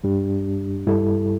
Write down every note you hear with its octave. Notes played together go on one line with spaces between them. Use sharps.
G2 G3 D4 G4
G2 G3 E4 A4